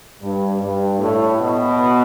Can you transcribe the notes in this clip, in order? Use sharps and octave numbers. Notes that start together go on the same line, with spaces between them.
G2
G2
A2
B2